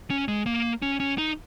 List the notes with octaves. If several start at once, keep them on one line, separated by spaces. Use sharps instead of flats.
C#4
G#3
A#3
C#4
C#4
D#4